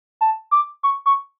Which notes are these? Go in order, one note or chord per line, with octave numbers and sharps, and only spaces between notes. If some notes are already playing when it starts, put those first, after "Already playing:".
A5
D6
C#6
C#6